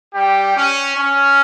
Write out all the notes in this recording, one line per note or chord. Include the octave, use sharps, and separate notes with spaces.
G3 G4
C#4
C#4